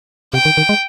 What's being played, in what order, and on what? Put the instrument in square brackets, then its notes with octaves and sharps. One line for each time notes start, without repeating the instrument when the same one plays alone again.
[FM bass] C3 [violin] G5
[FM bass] D#3
D#3
G#3